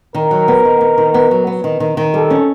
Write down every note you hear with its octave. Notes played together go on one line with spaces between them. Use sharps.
D#3 A#4
F#3
B3
D#3
B3
D#3
B3
F#3
B3
D#3
D#3
D#3
G3 A4
C#4